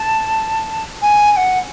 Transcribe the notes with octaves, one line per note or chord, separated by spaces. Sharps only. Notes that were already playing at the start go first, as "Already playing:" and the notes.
Already playing: A5
G#5
G#5
F#5